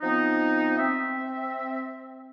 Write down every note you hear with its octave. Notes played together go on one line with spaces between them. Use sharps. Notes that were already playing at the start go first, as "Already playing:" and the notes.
F3 B3 C4 D#4
C4 E5